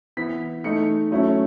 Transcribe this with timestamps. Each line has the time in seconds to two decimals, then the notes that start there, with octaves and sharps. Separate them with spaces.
0.17 E3 B3 E4 B6
0.64 E3 A3 D#4 C#7
1.11 F#3 A3 C#4 E4